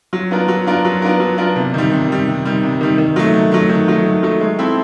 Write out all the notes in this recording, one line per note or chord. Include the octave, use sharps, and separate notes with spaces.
F#3
B3 D4 F4 A#4
F#3
B3 D4 F4 A#4
F#3
B3 D4 F4 A#4
F#3
B3 D4 F4 A#4
C3
D#3 G3
C3
D#3 G3
C3
D#3 G3
C3
D#3 G3
D#3
F#3 A3
D#3
F#3 A3
D#3
F#3 A3
D#3
F#3 A3
G#3
C4 E4 A4